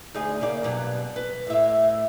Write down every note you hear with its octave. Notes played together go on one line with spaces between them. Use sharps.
D2 D#4 G#4
C#3 A#3 D5
G2 B2 F#3
B4
A2 E5